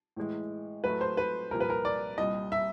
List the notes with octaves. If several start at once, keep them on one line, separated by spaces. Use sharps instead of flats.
A2 E3 G#3
A2 F#3 A3 B4
C5
B4
C2 A#2 F3 A#4
B4
A#4
D5
C2 A#2 G3 D#5
E5